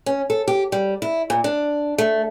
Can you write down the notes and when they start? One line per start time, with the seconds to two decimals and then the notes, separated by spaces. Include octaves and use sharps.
0.06 C#4
0.30 A4
0.48 G4
0.72 G3
1.02 E4
1.30 A#2
1.44 D4
1.98 A3